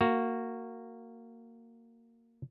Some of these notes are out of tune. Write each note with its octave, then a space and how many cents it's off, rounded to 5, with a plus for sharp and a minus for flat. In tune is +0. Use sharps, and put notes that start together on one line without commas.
A#3 -15 F#4 +0